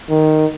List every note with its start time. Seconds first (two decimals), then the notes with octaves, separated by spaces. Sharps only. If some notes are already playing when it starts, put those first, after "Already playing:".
0.10 D#3